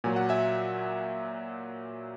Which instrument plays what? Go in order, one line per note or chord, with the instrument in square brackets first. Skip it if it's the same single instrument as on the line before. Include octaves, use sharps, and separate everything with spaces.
[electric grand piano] A#2 F#3 G#5
F#5
E5 G#5